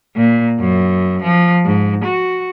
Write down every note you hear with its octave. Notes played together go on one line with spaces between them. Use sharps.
A#2
F#2
F3
G#2
F#4